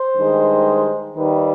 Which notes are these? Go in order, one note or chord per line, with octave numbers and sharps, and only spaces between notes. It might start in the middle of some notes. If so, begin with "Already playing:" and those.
Already playing: C5
G2 D#3 G#3
D#2 D#3 G3 B4